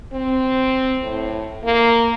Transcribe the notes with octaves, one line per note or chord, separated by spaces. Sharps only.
C4
A2
A#3